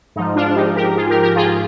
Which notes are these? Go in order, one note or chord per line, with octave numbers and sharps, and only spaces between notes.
G#2 F3 D#4
D4 F4
D#4 G4
G4 A#4
F4 G#4
G4 A#4
G4 A#4
F4 G#4